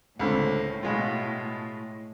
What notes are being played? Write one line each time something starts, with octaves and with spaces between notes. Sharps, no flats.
C#2 A2 D3 C4
B2 G#3 F4